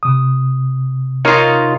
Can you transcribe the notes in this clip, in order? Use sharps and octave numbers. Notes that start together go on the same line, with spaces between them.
C3 D#6
D#4 F4 A#4 C#5